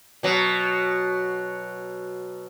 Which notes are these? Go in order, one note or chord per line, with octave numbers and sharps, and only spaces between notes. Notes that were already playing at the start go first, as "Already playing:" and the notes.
B2 F#3